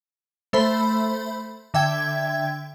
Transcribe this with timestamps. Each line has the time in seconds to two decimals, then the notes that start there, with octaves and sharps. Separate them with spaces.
0.53 A3 C5 E5 B5
1.74 D3 E5 G5 G#6